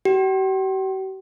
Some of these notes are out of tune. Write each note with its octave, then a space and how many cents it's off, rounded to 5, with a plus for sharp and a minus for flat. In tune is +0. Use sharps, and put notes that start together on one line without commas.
G4 -45